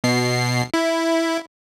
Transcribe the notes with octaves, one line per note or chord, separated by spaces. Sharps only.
B2 C7
E4